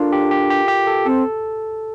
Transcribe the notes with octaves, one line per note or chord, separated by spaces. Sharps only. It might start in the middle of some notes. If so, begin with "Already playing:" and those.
Already playing: D4 F4 A4 A#4
G4
G4
G4
G4
A4
C4 A4